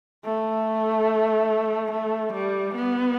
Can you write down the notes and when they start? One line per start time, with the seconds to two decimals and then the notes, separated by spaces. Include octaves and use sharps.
0.25 A3
1.91 A3
2.32 G3
2.75 B3